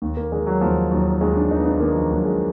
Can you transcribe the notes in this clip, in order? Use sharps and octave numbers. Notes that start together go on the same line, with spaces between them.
D#2
A#3
D#3 G#3
F#3
D#2 F3
D#2 F#3
D#2 G#3
D4
D#3 D#4
B3
D4
D#3 A#3
F3
D#2 F#3
G#3